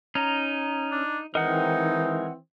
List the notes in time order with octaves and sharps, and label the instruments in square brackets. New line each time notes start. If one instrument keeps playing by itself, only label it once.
[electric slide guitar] C#4 [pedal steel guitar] D#4 A#5
[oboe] D4
[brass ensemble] D#3 E3 C4 [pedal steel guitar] G#3 A#4 [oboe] D#4 [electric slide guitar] D#5 F#5